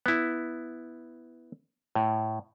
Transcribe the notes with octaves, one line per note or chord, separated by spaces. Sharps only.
B3 E4
A2